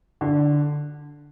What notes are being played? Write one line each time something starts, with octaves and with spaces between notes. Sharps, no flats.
D3